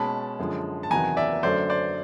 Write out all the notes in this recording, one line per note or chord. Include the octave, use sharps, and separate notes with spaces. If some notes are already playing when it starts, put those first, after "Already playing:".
Already playing: B2 G#3 C#4 A5 B5
F#2 D3 F3 G#3
A5
E2 C3 D#3 F#3 B3 G#5 A#5
D5 E5
F#2 D3 F#3 A3 C5 D5
C5 D5